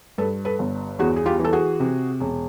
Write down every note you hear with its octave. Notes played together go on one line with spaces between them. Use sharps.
G2 A4 B4
A4 B4
G1
E2 F#4 G#4
G#4
F4 G4
E3
A4
F#4 G#4
C3
E1